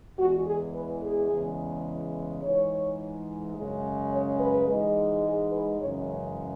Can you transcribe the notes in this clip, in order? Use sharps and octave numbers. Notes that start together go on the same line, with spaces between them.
E2 E3 G#3 F#4
G#4
B4
G#4
E2 C#3 E3 G#3
G#2 E3 G#3 C#5
F#2 C#3 G#3
C#5
B4
G#2 E3 G#3
G#4
B4
F#2 C#3 E3 G#3 C#5